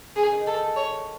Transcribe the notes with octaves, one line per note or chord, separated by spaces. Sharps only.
C#3 G#4
D#3
D#3 A4
C#5